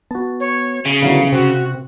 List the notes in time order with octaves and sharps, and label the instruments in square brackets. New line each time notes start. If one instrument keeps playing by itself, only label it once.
[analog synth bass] B3 [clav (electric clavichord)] F#4 A5
[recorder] C#5
[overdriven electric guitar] C#3
[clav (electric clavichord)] D3 E3 F#3 [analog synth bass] B3 [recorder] F5
[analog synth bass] C3 [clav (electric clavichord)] C4 [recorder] F#4